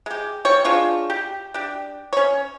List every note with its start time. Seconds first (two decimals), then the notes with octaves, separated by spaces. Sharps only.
0.06 G#3 G4
0.45 G3 C#5
0.65 G#3 D4 F4 C#6
1.10 G4
1.54 D4 G4
2.13 C#4 C#5